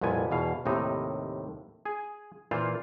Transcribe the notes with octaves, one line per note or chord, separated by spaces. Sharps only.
C2 F2 A#2 B3 G#5
E2 B2 F5
D#2 A2 C3 D#4 D#5
G#4 G#5
A#2 E3 F4 C5 F5